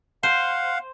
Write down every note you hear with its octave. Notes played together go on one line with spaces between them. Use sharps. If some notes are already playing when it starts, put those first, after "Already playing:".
C5 F5 F#5